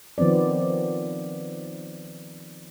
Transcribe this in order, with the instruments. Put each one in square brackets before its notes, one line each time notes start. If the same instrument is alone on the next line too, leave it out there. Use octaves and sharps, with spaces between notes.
[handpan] D#3 F3 B3 C4 D5